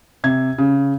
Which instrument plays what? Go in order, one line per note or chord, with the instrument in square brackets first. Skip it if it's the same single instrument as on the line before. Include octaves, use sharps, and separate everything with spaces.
[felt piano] C3 G#6
C#3